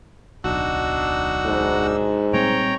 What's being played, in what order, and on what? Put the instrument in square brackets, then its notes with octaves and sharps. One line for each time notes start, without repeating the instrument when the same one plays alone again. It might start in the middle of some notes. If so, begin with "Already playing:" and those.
[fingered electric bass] D1 B1 [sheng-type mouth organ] D4 D#4 E6 [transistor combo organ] F#4
[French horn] G#2
[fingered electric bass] A#2 G3 C4 [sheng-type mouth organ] C#5 G5 A#5